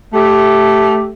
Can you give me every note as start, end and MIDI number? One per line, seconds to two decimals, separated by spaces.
0.13 1.11 57
0.13 1.11 67